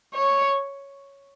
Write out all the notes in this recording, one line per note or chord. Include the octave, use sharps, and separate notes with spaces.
C#5